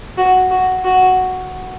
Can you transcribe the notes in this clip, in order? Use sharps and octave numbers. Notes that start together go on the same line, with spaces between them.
F#4
F#4
F#4